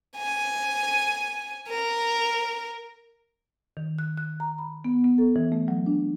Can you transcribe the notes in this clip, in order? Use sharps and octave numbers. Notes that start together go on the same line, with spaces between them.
G#5
A#4
D#3
F#6
F#6
A#5
B5
B3
B3
A4
E3
A3
F#3
D4